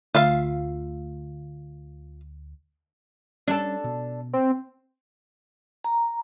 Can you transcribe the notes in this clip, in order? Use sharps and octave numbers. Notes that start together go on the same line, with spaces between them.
D2 F4 E5 F5
G3 C#4 D4 A4
B2
C4
A#5